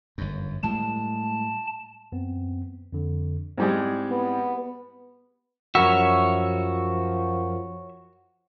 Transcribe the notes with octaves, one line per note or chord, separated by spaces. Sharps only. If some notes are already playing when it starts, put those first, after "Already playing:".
G1 F#2
A2 G3 G#3 A5
F#2 B3 C4
F2 D3
G#2 G3 G#3 C4 E4 D5
B3
F#2 F3 F#4 A#4 C#5 E5 B5